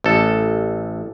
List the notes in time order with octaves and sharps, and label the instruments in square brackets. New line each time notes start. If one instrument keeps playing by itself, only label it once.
[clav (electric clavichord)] A1 A4